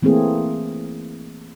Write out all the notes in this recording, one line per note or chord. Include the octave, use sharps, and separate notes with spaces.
E3 A3 A#3 C4 G#4